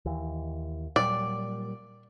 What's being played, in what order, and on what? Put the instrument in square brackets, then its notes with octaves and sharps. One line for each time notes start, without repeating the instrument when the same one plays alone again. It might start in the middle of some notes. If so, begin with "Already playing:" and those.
[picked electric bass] D#2 E3
[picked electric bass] A#2 F#3 G3 [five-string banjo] D5